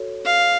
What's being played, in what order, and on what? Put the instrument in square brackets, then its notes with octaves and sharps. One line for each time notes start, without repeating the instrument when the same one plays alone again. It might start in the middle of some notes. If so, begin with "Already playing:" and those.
Already playing: [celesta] F#4 A4 C#5
[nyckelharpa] F5